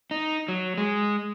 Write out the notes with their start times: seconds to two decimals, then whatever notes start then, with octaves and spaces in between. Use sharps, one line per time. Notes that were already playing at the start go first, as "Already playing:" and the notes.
0.11 D#4
0.48 F#3
0.78 G#3